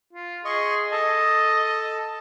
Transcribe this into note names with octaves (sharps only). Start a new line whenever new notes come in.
F4
G#4 D#5 C6 C#6
A4 D#5 A5